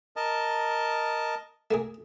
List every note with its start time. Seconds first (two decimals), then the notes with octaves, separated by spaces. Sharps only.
0.16 A#4 D#5 A5
1.71 A3 A#3 G#4